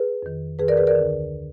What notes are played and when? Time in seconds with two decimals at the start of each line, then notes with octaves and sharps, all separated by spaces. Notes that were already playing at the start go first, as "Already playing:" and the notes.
Already playing: G#4 B4
0.23 F2 D#3
0.59 F2 D#3 G#4 B4
0.68 A#4 D5
0.77 G#4 B4
0.87 A#4 D5
0.96 D2 D3